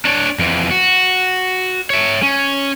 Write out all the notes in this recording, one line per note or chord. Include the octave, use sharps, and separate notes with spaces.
D4 C#5
F2 E3
F#4
C#5 E5
C#4